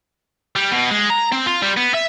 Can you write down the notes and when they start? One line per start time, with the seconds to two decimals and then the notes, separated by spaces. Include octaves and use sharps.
0.56 G3
0.71 B2
0.91 G#3
1.10 A#5
1.32 C4
1.47 F4
1.62 G3
1.77 B3
1.94 E5